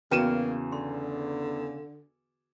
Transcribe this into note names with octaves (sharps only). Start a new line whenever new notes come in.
E2 C#3 A#3 F#4 B4 G5 D#7 E7
D3 C6